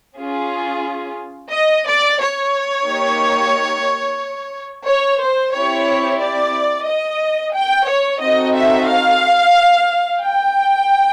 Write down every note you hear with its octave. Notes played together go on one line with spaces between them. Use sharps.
C#4 F4 G#4
D#5
D5
C#5
A#3 D#4 G4
C#5
C5
C4 E4 G4 C#5
D5
D#5
G5
C#5
C4 D#4 F#4 A4 D#5
E5
F5
G5